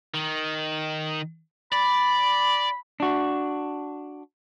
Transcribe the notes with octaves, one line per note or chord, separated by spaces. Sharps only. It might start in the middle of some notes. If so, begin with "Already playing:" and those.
D#3
D5 B5
D4 F#4